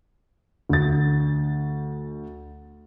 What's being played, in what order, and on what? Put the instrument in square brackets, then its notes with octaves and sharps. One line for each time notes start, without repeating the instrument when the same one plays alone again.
[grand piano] D2 A6